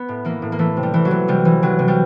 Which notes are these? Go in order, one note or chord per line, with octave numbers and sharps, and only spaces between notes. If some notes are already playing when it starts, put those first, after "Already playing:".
Already playing: B3
A2
E3 A#3
A2
A#3
E3 A3
C3
G3
E3
F#3
E3
C3 G3
E3
C3 F#3
C3
G3